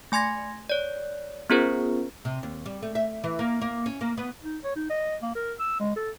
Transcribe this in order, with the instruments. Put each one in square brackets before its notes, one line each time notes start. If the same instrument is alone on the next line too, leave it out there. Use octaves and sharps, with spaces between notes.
[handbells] A3 G#5 C6 G#6 A#6
C#5 D5
B3 C#4 F4 G#4 A#4 C5
[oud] C3
D#2
G3
A3
E5
E3
A#3
A#3
C#4
A#3
B3
[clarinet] D#4
C#5
D#4
D#5
A#3
A#4
E6
G#3
A4